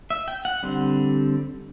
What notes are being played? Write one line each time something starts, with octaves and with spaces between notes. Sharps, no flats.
E5
G5
F#5
D3 G3 C4